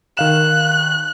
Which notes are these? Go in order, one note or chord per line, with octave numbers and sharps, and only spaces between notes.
D#3 F5 F#6 E7